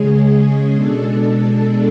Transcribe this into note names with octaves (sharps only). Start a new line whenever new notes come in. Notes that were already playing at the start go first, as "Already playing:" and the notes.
Already playing: C#3 G#3 C#4 G#4
B2 G#3 D4 A4